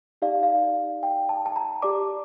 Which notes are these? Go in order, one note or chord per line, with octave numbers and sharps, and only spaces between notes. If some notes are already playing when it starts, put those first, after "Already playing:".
D#4 G4 D5 F5
F5
G5
A5
A5
A#5
G4 D5 D6